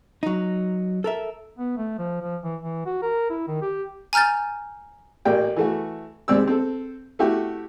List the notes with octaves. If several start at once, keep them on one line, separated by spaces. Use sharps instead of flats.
F#3 D#4
A4 A#4 E5
B3
A3
F3
F3
E3
E3
F#4
A#4
E4
D#3
G4
G#5 A#5 F6 G6 A6
A1 A#2 A#3 D5 G5
E3 A3 F#4
D#2 G#2 C4 D5 E6
C4 A4
A3 E4 F#4 G4